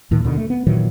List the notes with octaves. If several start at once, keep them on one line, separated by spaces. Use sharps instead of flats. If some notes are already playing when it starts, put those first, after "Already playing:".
D#2 A2 D#3
D#2 B2 D3 D#3
A3
B3
A#2 D#3 E3 F#3